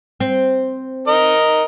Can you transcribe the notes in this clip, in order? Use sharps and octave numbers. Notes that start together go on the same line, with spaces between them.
C4
A#4 D#5